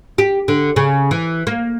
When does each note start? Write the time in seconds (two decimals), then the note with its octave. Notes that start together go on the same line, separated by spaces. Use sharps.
0.18 G4
0.48 D3
0.76 C#3
1.11 E3
1.47 A#3